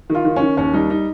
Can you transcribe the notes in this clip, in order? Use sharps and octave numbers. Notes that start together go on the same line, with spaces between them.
D#3
F4
D#3
C#4
D#3
D#2 C#4
G3 D#4
D#4